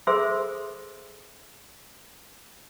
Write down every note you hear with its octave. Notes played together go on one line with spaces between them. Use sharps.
G#4 A4 C5 E5 C6 E6